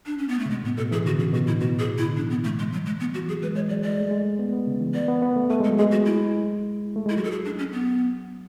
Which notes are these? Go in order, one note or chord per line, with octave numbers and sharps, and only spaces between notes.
D4
C#4
B3
A3
C#3
B2 G#3
A2 B3
B2 A4
E3 G#4
D3 F#4
C#3 G#4
B2 F#4
A2 E4
B2 F#4
A2 G#4
B2
E4
D3
E3 D4
B3
A3
G#3
F#3
G#3
B3
F#4
E3
F#3 G#4
G#3 B4
G#3 C#5
F#3 D5
G#3 D5
A3
G#3
B3
B3
C#3
E3
B3 D5
B3
B3
A3
A3 B4
G#3 A4
F#3
G#3 G#4
F#4
E4
A3
G#3 E4
F#3 F#4
A4
G#4
D4
C#4
B3